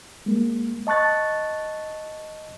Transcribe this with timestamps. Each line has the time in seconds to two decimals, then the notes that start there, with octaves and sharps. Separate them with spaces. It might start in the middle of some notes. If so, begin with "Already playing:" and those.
0.26 G#3 A#3
0.87 D#5 A5 C#6 F#6 A6